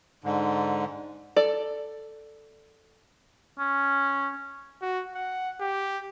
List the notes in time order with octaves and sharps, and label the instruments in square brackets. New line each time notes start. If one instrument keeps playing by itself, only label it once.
[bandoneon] G#2 D3
[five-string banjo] A4 D5
[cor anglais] C#4
[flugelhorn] F#4
F#5
G4